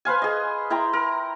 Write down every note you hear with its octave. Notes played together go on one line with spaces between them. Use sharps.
B4 C5 F5 G#5
G#4 D#5
E4 G5 A#5 C6
A#4